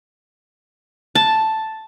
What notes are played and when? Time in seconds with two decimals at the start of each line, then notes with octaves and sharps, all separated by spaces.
1.15 A5